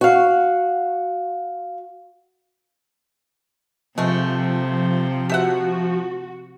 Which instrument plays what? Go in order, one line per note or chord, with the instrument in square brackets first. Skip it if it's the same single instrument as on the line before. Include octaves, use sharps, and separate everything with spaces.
[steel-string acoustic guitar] F#4 F5
[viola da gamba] C3 [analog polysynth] F3 [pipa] G#3 A3
[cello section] F#4 [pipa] G4 E5 F#5